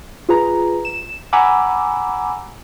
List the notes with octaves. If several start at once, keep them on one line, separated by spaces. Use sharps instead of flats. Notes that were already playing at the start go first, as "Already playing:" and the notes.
F4 G#4 B4 A#5
E7
F#5 G#5 A#5 B5 D6 E6